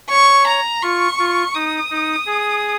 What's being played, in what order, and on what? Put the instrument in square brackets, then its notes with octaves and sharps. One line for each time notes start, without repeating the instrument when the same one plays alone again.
[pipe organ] C#5 [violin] C#6
[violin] A#5
[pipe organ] F4 [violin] C#6
[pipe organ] F4
[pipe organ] D#4 [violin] D#6
[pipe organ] D#4
G#4